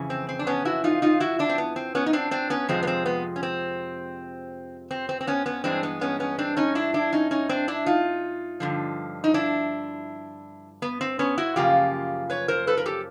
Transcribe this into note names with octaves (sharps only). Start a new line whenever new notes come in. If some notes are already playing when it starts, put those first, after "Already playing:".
Already playing: F2 C#3 E3
C4
C4
D4
B3 C#4
E4 F#4
D#4 F4
D#4 F4
E4 F#4
D4 E4
C4
B3
C4
B3 C#4
D#4
C4 D4
C4 D4
B3 C#4
F2 C3 F3 G#3 C4
B3
C4
B3
C#4
C4
C4
C4
C4
B3 C#4
B3 C#4
G2 E3 G#3 C4 D4
B3
B3 C#4
B3 C#4
C4 D4
C#4 D#4
D4 E4
D4 E4
C#4 D#4
C#4 D#4
C4 D4
D4 E4
D#4 F4
G2 D3 F3
D#4
D4 E4
B3
C4
B3 C#4
E4 F#4
F#2 C#3 F3 A#3 F4 G4
B4 C#5
A#4 C5
A4 B4
A#4
G4 A4